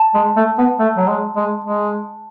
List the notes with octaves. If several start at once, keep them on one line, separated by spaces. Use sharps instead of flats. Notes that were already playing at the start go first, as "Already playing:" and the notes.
Already playing: A5
G#3
A3
B3
A3
F#3
G#3
G#3
G#3